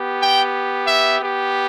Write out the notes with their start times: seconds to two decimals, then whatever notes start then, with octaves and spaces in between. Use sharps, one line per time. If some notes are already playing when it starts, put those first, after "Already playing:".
Already playing: B3 G4
0.21 G5
0.87 E5
1.20 B3 G4